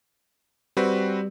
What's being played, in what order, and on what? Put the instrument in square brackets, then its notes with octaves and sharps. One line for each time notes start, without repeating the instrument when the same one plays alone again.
[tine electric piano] G3 [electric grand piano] C4 F#4 B4